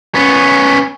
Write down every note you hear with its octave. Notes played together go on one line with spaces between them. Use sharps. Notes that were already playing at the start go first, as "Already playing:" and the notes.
B3 C#4